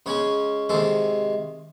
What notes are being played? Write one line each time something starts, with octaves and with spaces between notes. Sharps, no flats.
C#3 G#3 C#4 C#5
C3 D#3 G#3 A4